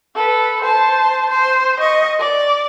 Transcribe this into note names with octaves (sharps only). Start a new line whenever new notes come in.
A4 B4
C5 A5
C5
D#5 C#6
D5